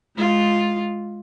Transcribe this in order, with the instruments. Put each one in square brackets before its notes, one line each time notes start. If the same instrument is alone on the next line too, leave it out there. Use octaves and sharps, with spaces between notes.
[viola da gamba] G#3 F4